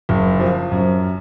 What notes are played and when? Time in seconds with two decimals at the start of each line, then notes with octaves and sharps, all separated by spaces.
0.09 F#1
0.40 F3
0.71 F#2